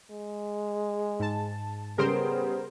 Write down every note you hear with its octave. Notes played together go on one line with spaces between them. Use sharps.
G#3
G#2 A5
C#3 G3 B3 A#4 C5 D7